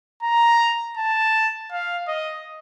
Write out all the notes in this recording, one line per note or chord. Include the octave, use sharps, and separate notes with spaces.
A#5
A5
F5
D#5